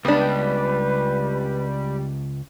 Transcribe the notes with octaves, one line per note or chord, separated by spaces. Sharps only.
C#2 G3 B3 D4 B4